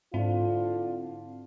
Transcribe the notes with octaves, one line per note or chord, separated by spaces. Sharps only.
G#2 D3 C4 D4 E4 F4